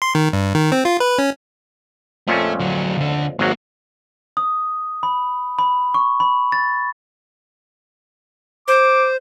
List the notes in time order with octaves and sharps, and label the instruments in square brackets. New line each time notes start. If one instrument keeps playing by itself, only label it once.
[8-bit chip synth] C6
D#3
G2
D#3
C4
F4
B4
C#4
[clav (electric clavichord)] F2 A#2 C#4 [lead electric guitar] A3
[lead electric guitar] D2 F#3
D2 D3
[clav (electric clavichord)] G#1 F#3 [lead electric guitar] G#3 A#3
[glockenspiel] D#6
B5
B5
C#6
B5
A6
[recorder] C5 [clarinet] D6